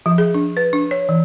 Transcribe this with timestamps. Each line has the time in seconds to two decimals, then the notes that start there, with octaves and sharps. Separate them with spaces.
0.06 F3
0.18 G#4
0.34 D4
0.57 B4
0.73 D4
0.91 C#5
1.09 E3